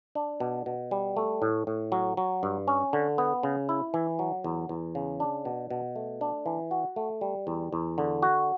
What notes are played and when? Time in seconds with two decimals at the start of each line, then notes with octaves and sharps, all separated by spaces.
0.15 D4
0.40 B2
0.66 B2
0.91 G3
1.17 A3
1.42 A2
1.67 A2
1.92 F#3
2.17 F#3
2.43 G2
2.68 C#4
2.93 D3
3.18 B3
3.43 C#3
3.69 E4
3.94 E3
4.19 F#3
4.44 E2
4.69 E2
4.95 C#3
5.20 D4
5.45 B2
5.70 B2
5.96 A3
6.21 D4
6.46 E3
6.71 F#4
6.96 A3
7.21 G3
7.47 E2
7.73 E2
7.98 D3
8.23 F#4